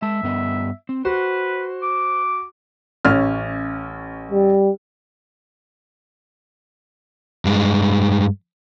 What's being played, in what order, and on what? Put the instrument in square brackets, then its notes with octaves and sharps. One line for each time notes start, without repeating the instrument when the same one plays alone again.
[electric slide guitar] G#3 A5 [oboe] E5
[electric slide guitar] G2 B3 D#5
C4
[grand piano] F#4 [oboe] B4 [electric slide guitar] C5
[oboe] D6
[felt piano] A1 C#4 F6
[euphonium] G3
[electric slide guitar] G2 G#3